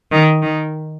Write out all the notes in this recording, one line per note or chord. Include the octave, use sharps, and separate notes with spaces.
D#3
D#3